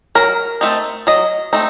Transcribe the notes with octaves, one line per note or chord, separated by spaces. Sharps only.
F#3 A#4
A3 C4 D#4
F#3 D#5
A3 C4 D#4